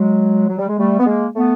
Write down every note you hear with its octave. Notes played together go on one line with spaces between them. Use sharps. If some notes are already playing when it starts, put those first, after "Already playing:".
Already playing: F#3 G#3
F#3
G3
G#3
G3 A3
B3
G#3 A#3
A3 B3